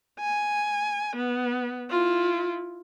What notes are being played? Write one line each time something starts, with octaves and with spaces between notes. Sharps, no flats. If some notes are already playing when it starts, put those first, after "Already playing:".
G#5
B3
E4 F4